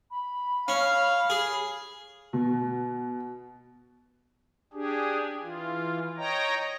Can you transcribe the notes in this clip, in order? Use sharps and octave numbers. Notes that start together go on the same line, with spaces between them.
B5
C#4 F5
G#4
B2
D4 G4 G#4
E3 F4
C#5 D#5 G5 A#5